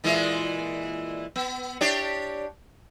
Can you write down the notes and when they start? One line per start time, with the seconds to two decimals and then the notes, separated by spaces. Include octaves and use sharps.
0.04 A#2 E3 G#3
1.36 B3
1.81 D4 G4 C#5